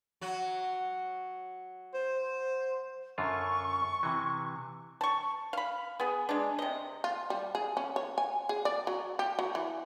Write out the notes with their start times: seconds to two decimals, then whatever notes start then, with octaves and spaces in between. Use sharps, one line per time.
0.21 F#3 F#4
1.94 C5
3.18 F#2 D3 F4 C#6
4.03 C3 E3
5.01 A5 C#6
5.53 F5 B5
6.00 B3 G#4
6.29 G#3 D4
6.59 C3 D#5
7.04 F4
7.30 G3
7.55 G#4
7.77 C#4
7.96 C#5
8.18 G#5
8.49 G#4
8.65 D5
8.87 F#3
9.19 G4
9.39 F#3
9.55 E3